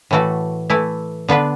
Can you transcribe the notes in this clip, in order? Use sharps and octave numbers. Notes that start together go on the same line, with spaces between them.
A2 E3 A3 F#4
E3 A3 E4
D3 B3 D4 B4